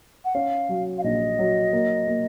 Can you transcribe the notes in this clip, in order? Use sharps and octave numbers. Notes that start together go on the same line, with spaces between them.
F#5
C#4 F5
F#3
F5
A#1 D#5
F#3
A#3
A#3